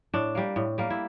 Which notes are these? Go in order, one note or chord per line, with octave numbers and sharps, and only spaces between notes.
A2 D4
G3 A#3
A2
G3 A#3
E4